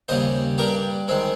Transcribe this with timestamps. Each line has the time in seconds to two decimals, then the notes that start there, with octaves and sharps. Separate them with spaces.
0.08 D#2 C#3 G3 C5 D#5
0.58 G2 G3 G4 A#4
1.08 D#3 G#3 C4